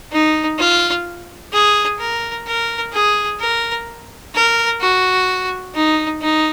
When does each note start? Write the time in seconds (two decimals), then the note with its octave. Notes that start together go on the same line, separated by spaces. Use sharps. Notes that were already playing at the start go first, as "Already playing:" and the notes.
0.12 D#4
0.59 F4
1.53 G#4
2.00 A#4
2.47 A#4
2.93 G#4
3.40 A#4
4.35 A#4
4.81 F#4
5.74 D#4
6.21 D#4